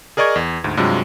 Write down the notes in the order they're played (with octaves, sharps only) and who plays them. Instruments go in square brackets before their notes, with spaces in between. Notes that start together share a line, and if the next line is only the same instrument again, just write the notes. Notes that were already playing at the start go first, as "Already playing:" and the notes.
[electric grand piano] G#4 A#4 D5 D#5 C#6 G#6
E2
D2 G#2
G2 C3 F#3 G#3 F4